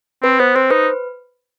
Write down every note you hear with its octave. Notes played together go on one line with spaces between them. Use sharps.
C4 B4
B3 C5
C4 C5
D#4 B4